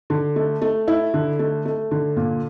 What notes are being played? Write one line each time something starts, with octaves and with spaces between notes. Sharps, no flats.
D3
A3
A3
E4
D3
A3
A3
D3
A#2